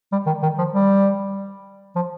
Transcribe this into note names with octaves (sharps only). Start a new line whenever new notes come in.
G3
D#3
D#3
F3
G3
F3